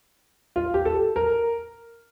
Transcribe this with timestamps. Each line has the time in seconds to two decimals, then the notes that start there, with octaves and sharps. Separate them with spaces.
0.56 F4
0.74 G4
0.85 A4
1.16 A#4